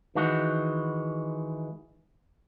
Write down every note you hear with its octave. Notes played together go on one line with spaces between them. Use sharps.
D#3 E3 G#3 F#4